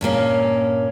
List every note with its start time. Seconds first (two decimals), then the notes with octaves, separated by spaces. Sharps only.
0.01 G2 A#2 A#3 C#4